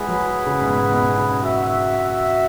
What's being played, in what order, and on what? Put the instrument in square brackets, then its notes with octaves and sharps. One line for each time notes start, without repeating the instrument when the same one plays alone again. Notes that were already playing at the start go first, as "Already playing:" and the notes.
Already playing: [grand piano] G#3 [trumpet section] E4 G#4 B4 F#5
[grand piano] F#3
C#3
G#2
B2
B2
C#3
[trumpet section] F#4 E5